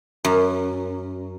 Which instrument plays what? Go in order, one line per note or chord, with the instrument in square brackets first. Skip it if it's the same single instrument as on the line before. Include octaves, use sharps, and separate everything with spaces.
[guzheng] F#2